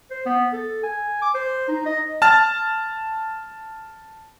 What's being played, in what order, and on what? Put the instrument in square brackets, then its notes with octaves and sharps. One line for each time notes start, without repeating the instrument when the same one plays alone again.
[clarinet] C5
B3
A4
G#5
D6
C5
D#4
D#5
[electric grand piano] A5 F6 A6